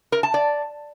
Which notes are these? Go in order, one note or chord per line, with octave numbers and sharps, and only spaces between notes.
A#4
A5
D5